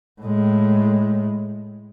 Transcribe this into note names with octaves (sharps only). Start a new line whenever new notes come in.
A2 G#3